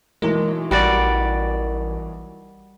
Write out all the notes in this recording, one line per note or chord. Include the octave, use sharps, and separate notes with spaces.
B1 E3 G#3 A#3
A1 G3 F#4 D5